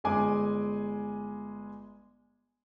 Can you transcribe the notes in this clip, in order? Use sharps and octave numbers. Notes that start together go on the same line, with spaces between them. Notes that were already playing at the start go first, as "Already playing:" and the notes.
G1 G#3 G#5 D6